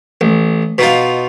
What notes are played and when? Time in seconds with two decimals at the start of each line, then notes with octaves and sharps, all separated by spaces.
0.21 A1
0.78 B2 D#4 F4